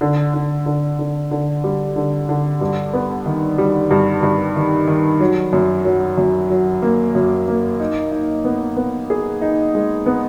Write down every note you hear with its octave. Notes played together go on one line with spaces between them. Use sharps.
D3
D3
D3
D3
D3
G3
D3
D3
G2
B3
D#3
G3
G2
G2
D#3
D#3
F#3
F#2
F#3
F#2
F#3
A#3
F#2
A#3
D#4
D#4
B3
B3
G#4
D#4
G#3
B3